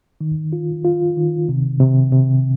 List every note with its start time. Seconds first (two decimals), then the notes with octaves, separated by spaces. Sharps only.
0.21 D#3
0.53 F4
0.85 F4
1.17 D#3
1.49 C3
1.80 C3
2.12 C3